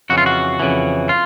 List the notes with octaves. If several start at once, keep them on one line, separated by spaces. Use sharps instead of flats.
F2 C#3 E3 F#4
F4
F#4
F2 C#3 E3
F4